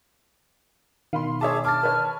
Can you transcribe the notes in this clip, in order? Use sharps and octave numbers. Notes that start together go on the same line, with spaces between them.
B2 D#3 F5 B5 C6
G#4 C#5 E5 A5 D6
A5 D6 F6 A6
B4 C#5